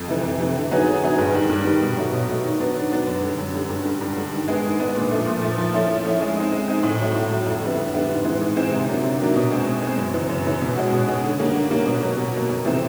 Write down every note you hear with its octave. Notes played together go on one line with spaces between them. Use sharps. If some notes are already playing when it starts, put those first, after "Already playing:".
Already playing: F2
C3 E3
F2
C3 E3
D3
F#3 B3 D#4 G#4
D3
F#3 B3 D#4 G#4
G2
D#3 G3
G2
D#3 G3
B2
F#3 A3
B2
F#3 A3
D#3
F#3 B3 D4
D#3
F#3 B3 D4
F#2
D3 G3
F#2
D3 G3
G2
D3 G3
G2
D3 G3
D#3
G#3 B3 D4
D#3
G#3 B3 D4
A#2
F3 A3
A#2
F3 A3
F3
A3 C#4 E4
F3
A3 C#4 E4
G#3
C4 D#4
G#3
C4 D#4
A2
F#3 A3
A2
F#3 A3
F2
D3 G3 B3 E4
F2
D3 G3 B3 E4
G#2
E3 G#3 C4
G#2
E3 G#3 C4
C3
D#3 F#3 A#3 D4
C3
D#3 F#3 A#3 D4
B2
G#3 C4
B2
G#3 C4
F#2
C#3 E3
F#2
C#3 E3
B2
G#3 C#4 F#4
B2
G#3 C#4 F#4
D3
G3 A#3 C#4
D3
G3 A#3 C#4
B2
F#3 A#3
B2
F#3 A#3
F2
C3 E3 A3 C4